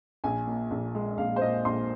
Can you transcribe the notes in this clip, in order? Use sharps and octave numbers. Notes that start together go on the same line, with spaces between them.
A#1 G#5
A#2
A#1
G#3
A#1 F5
C5
A#2 D#5
A#1 C6